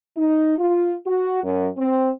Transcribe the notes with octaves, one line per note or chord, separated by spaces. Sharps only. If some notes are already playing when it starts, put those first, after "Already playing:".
D#4
F4
F#4
F#2
C4